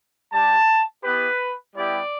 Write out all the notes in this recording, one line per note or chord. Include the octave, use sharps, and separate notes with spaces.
G3 D4 G4 A5
B3 E4 G4 B4
G3 B3 E4 G4 D5